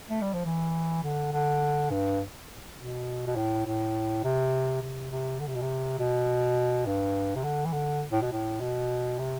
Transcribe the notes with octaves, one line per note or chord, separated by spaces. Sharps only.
A3
G3
F3
E3
D3
D3
G2
B2
B2
A2
A2
C3
C3
C3
D3
C3
B2
C3
B2
G2
C3
D3
E3
D3
A2
B2
A2
B2
C3